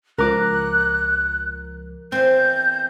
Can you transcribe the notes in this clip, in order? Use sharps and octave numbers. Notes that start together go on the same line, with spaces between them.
C#2 F3 A#4 D6 F#6
E2 C4 G6